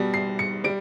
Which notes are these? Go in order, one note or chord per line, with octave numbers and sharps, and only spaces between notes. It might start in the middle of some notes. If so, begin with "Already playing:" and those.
Already playing: B2 G3
C7
C#7
G3 D7